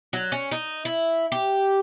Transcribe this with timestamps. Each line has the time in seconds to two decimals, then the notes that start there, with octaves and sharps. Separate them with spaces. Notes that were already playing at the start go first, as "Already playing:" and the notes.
0.13 F#3
0.32 C#4
0.51 D#4
0.85 E4
1.32 G4